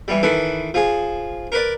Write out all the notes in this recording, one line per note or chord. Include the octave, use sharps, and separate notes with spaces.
E3 G3
D#3 E3 A4 B4
F3 G#4
A#4 B4 D5